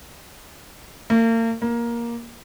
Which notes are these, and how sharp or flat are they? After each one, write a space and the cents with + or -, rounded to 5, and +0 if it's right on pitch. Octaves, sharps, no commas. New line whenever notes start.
A#3 -40
A#3 +10